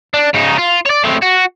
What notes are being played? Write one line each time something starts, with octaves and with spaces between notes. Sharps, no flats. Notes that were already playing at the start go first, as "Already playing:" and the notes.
D4
C#3 D#4
F4
C#5 D5
A2 C4
F#4